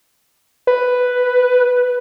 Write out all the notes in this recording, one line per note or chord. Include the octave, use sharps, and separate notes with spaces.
B4